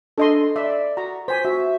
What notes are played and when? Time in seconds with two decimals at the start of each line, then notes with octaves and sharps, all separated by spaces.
0.18 D4 A4 D#5 C6
0.56 D5 E5
0.97 F#4 A#5
1.28 C5 G#5 B6
1.45 F#4 E5